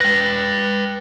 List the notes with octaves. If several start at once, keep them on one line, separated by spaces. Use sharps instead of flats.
B4 G5 A#6